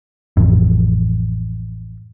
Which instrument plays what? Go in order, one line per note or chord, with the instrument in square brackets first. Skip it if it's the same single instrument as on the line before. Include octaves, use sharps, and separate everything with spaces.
[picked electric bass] A1 F2